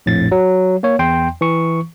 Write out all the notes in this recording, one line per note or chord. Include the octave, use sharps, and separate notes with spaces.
A#1 F2 A2 A6
F#3
A#3 C#5
E2 G5 C6
E3 C#6